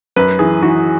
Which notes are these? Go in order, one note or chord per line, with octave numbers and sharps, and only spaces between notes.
F#2 B4
E3 G#4
E3 F#4